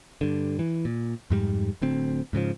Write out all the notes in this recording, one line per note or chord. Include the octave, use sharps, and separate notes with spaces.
G2 D3
E3
A#2
F2 G#2 G3
D1 D2 C4
G#2 C#3 E3 F3